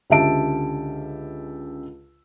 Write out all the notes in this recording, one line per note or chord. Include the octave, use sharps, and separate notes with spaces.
C#2 D3 G4 E5 A5 D7